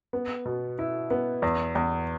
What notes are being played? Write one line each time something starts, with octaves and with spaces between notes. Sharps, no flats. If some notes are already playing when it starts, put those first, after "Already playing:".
B3
B2
E4
B3
E2
E2